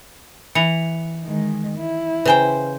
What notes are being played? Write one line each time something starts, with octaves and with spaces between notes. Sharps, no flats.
E3 C#7 F7
D#3 G#3
E4
C#3 B4 C5 G5 G#5